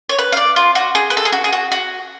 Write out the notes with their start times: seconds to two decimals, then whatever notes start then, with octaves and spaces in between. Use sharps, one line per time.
0.09 C#5
0.19 B4
0.32 F5
0.37 D5
0.56 F4
0.75 F#4
0.95 G#4
1.10 B4
1.17 A4
1.25 G#4
1.32 F#4
1.44 G#4
1.52 F#4
1.72 F#4